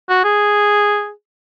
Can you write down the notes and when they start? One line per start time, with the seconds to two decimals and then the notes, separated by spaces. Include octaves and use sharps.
0.09 F#4
0.24 G#4